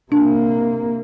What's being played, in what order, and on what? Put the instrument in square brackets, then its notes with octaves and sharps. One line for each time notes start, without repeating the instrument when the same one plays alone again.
[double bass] C3 A#3 [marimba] D4